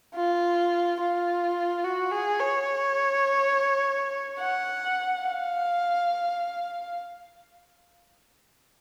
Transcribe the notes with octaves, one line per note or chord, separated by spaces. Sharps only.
F4
F4
F#4
G#4
C#5
F#5
F5